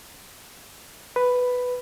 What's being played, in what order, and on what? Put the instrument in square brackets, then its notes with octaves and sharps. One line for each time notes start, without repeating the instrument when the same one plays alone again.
[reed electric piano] B4